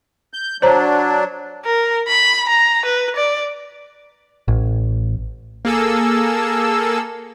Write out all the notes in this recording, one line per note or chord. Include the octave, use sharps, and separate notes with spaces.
G6
F#3 D4 C5 C#5 A#5
A#4
B5
A#5
B4
D5
A1
A#3 G#4 A4 E6